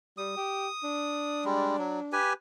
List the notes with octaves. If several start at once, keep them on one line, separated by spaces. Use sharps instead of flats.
G3 D#6
G4
D4
G3 G#3
F#3
G4 B4 G#5